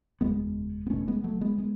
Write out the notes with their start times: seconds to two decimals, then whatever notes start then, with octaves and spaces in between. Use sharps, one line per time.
0.21 F#1 E2 B2 G#3 B3
0.87 B3
0.90 F#1 E2 B2 A3 C#4
1.08 G#3 B3
1.24 F#3 A3
1.41 G#3 B3
1.58 G#3 B3